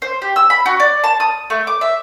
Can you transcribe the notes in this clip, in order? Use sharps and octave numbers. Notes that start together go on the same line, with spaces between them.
C5
G4
E6
B5
F#4
D5
A5
D#6
A3
D6
E5